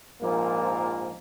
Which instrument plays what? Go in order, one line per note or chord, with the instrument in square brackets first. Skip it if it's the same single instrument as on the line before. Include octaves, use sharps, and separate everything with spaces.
[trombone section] A#1 G#2 F3 A#3